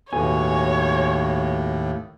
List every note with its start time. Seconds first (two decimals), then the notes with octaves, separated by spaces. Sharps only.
0.13 D#2 A2 B3 F#4 A4 C#5 G#5